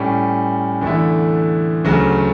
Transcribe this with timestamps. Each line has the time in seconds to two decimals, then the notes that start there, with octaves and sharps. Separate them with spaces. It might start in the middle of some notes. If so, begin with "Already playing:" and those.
Already playing: A2 G3 C#4
0.81 E2 D3 A3 E4
1.85 D2 C#3 F#3 A3